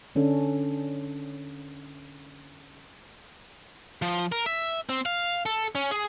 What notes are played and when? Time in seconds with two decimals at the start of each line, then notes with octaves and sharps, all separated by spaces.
0.15 D3 C#4 D4 A4
4.02 F3
4.32 A#4
4.46 E5
4.89 C4
5.06 F5
5.46 A4
5.75 C#4
5.91 G#4